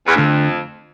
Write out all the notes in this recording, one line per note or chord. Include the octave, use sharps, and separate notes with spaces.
E2
F2 D3 A3 D4